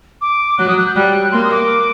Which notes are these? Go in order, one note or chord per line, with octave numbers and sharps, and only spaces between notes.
D6
F#3 F#6
D#6
F#6
G6
G3 F#6
A#3 C6
D#6
D6